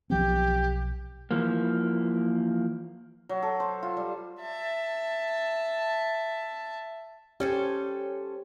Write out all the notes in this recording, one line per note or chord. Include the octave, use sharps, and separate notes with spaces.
B1 F3 C4 G4
E3 F3 A#3
F#3
A4
C5
F4
G3
E5 A5
C#4 G4 A4 C5 C#5